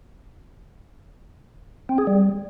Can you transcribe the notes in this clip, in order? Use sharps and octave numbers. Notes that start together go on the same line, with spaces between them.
C4
G#4
G3